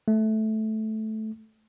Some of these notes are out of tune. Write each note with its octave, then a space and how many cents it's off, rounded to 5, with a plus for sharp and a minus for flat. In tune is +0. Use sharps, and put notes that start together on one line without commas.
A3 -10